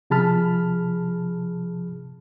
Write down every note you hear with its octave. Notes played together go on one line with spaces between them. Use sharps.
C3 F3 G#4 A5 B5 F6